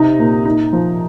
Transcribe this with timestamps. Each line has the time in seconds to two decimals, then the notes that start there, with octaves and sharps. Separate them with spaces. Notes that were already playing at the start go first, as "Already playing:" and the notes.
Already playing: C3 D#4
0.19 A#2
0.45 D#4
0.73 F3